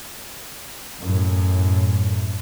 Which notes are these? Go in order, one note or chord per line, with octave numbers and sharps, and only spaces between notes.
F#2 A2